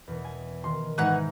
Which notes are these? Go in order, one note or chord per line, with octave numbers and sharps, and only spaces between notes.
E2 B2
G#5
D#3 C6
G#2 E3 D#4 B4 C#5 F#5